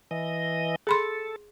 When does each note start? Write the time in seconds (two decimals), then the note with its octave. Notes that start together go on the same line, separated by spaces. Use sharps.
0.11 E3 D#5
0.87 G#4 A4 B5 C6